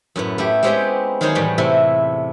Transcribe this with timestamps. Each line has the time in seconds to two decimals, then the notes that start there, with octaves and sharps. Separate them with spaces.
0.16 F#2 A2 B3
0.38 A3 E4 G4
0.63 G#3 B3 C4 G4 C#5 G5
1.21 D#3 F#3 D#4 G#4 C5 C#5
1.35 E2 A2 G3 B3 G5 B5
1.58 C3 A3 E4